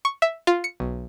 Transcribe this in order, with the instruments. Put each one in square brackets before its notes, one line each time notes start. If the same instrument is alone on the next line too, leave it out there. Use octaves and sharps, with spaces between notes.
[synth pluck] C#6
E5
F4
C#7
B1